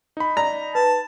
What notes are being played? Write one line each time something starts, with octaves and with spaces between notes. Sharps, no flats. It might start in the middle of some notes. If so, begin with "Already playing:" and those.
D#4 B5
D5 A#5
B4 A5